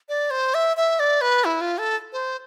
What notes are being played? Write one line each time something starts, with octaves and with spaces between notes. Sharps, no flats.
D5
C5
E5
E5
D5
B4
E4
F4
A4
C5